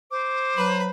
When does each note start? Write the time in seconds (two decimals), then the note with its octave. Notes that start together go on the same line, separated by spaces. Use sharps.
0.11 C5 D6
0.56 F#3 B4 B5